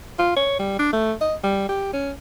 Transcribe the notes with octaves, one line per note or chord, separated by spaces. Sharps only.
F4
C#5
G3
D4
A3
D#5
G3
G4
C#4